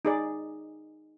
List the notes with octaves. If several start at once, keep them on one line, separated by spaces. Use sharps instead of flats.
D#4 G#4 D5